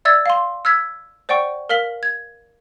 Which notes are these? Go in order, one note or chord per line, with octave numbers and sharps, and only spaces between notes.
D5 E5 E6 G#6 A6
F5 C6
E6 F6 G#6 B6
C5 D5 F#5 G5 C#6
A#4 F5 F6 B6 F#7
G#6